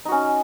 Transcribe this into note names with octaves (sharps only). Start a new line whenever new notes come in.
C#4 D#4 F#4